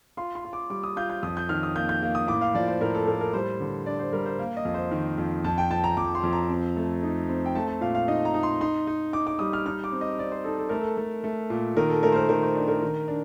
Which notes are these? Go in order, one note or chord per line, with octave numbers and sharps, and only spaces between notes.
F4 C6
C6
F4
D6
G3 D6
D#6
F4 G6
G6
F2 D#6
G6
D#3 F6
D#6
A#3 G6
G6
A#3
D#6
A2 D6
F5
F3 D5
C5
A2 A#4
A4
A2 A#4
A#4
G3 C5
D3
D4 D5
C5
G3 A#4
C5
A#3
D#5
F2
C5
D#3
F2
F2 A5
G5
F2 A5
A#5
F2 D6
C6
F2
A#5
C4
A3
D#4
C4
G5
A3 A5
A5
A#2 F5
F5
D#4 D#5
A#5
D#4
C6
D#4 C6
D#4
D#4 D6
D6
G3 D#6
F6
D#4 F6
D6
C4
D#5
C4 D5
C5
D#4 A4
A4
A3 A#4
A4
A3
A3
A#2
D#3 A#4
A4
A3 A#4
C5
A#4
D#3 A#4
C5
D4
A#4
D#3
D4